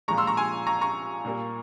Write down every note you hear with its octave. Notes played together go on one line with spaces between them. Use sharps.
A#2 F3 G#3 A#5 C#6
C6 E6
A#5 C#6
G#5 C6
A#5 C#6
A#5 C#6
A#2 G3 A#3